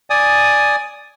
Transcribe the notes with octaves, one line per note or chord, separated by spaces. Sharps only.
D5 G#5 D#6